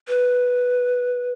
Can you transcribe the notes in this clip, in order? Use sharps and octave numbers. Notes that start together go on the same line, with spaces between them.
B4